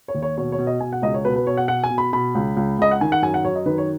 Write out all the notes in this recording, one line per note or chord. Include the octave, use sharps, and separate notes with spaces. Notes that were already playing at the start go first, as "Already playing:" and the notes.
C#5
D#2
C#5
B2 C#5
C#5
B2
D#5
B2 G#5
F#5
C#2 D#5
C#5
B2 B4
B4
B2 C#5
F#5
B2 F#5
G#5
B2
B5
B2 B5
C#2
C#2
C#2 D#5
F#5
D#3 G#5
F#5
F#2 G#5
F#5
F#2 C#5
D#5
D#3 B4
C#5